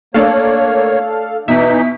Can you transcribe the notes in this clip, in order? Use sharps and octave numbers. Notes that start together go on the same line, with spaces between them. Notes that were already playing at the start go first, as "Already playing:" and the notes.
A3 A#3 D4 A4 C#5 F5
B2 E3 D#4 E5 B6